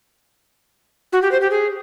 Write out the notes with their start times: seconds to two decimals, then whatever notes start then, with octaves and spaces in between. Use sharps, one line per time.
1.13 F#4
1.22 G4
1.32 C5
1.41 G4
1.51 G#4